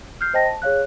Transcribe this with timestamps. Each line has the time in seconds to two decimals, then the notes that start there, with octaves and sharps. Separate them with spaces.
0.21 F6 G6 C7
0.34 C5 D#5 G5 A5 A#6
0.46 A5
0.62 G#4 C#5 F5 F#6